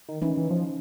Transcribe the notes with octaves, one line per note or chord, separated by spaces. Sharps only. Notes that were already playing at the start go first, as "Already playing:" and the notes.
D#3
E3 C#4 D#4
E3
F3